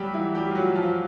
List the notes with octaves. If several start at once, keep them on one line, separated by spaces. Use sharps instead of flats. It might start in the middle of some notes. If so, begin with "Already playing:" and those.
Already playing: F#3 G3 F#4 G4
E3 E4
G3 G4
F4
F#3 F#4
F3 F4